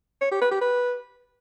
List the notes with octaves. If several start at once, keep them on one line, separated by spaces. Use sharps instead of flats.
C#5
G4
B4
G4
B4